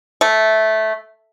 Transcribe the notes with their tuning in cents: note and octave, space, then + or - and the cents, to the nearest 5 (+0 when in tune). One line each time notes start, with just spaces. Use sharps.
A3 -10